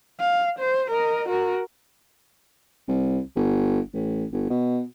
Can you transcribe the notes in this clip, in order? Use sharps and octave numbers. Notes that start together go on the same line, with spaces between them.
F5
C5
A#4 D#5
F#4 A#4
C2
G1
A1
G1
B2